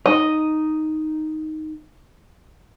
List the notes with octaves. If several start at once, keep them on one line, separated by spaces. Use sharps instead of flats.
D#4 D#5